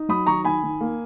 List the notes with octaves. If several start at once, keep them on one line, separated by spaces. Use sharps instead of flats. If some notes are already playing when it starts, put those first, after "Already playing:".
Already playing: D#4
F#3 B5 D#6
D#3 A#5 C#6
D#3 G#5 B5
D#3
A#3